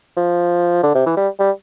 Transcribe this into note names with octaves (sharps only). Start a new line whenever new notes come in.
F3
D3
C3
E3
G3
G3